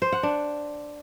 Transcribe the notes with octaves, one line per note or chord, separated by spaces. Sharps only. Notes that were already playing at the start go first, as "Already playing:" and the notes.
C5
F#5
D4